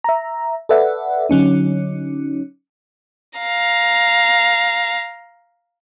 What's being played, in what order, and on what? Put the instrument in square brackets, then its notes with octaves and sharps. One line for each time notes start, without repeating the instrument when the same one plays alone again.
[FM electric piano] E5 A#5
A4 B4 D5 E5 F#5
D3 F#3 C#4 D#4
[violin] F5 A#5